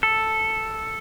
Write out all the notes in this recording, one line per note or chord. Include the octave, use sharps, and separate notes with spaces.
A4